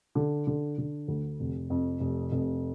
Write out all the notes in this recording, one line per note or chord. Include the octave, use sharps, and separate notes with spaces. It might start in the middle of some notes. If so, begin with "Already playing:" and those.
D3
D3
D3
D2
F1
F2
F1
F1